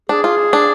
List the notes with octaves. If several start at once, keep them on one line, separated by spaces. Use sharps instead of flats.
D4 G#4
F4
D4